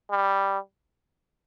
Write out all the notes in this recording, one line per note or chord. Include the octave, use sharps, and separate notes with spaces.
G3